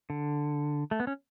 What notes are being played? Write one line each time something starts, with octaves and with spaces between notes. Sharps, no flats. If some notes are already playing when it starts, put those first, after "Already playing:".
D3
A3
B3
C#4